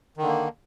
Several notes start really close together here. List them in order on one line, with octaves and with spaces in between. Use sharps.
D#3 D3 A#3